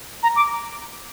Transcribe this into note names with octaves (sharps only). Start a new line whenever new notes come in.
A#5
D6